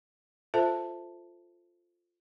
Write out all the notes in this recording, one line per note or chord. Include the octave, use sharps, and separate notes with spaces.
F4 A4 C5 E5 A5